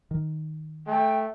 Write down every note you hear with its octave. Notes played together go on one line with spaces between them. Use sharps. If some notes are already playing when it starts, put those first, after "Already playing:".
D#3
A3 G5